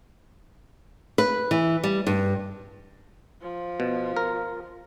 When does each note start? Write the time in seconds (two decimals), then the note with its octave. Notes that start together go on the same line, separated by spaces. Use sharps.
1.18 B4
1.51 E3
1.84 G3
2.07 G2
3.42 F3
3.80 B2
4.17 A#4